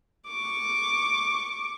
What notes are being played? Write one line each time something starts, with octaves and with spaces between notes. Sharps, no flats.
C#6 D6